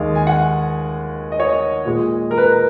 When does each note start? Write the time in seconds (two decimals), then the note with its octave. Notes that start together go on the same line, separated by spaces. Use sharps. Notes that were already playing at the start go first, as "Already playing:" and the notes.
Already playing: D#2 D#3 G#3 F5
0.15 G#5
0.27 F#5
1.32 D#5
1.40 C#5
1.48 D#5
1.85 A#2 G#3
2.31 A#4
2.38 B4
2.52 A#4